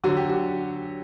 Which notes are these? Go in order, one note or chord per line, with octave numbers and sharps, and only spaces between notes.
D3 F#3 F#4
G4
F#4